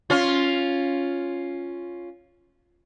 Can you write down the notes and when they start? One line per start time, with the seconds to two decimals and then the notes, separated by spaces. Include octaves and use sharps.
0.10 C#4 F4